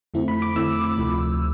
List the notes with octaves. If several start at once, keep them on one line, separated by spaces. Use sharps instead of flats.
F2 D3 A3 C4 E4
B5
D6
F2 D3 A3 C4 E4 E6
D2 C3 F3 A3